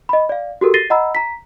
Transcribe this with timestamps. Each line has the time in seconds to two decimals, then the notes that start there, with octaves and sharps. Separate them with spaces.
0.09 D#5 B5
0.29 D5 F5
0.61 F#4 G4 A4 A#4
0.74 A6 A#6 C7 D#7 G7
0.90 D#5 F#5 A#5 B5 E6
1.15 A#5 B6